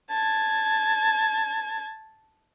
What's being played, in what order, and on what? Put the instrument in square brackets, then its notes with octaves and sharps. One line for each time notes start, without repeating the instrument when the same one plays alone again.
[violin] A5 G#6